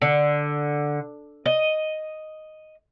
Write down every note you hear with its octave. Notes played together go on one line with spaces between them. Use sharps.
D3
D#5